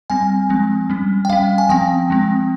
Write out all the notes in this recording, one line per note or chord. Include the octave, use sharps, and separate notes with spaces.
G3 C4 G#5
F3 G#3 C4
G3 C#4
G5
G3 C#4 F5
G#5
F3 C4 G5
F3 G#3 C4